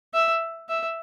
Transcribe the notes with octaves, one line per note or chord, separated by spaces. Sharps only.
E5
E5